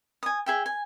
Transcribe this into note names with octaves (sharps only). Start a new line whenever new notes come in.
G#5 D#6
G#4 E5 G5
G#5